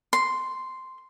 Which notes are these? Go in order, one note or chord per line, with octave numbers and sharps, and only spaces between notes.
C6